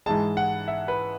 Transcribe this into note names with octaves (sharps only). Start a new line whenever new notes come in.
G#2 E3 G#3 A5
F#5
E5
B4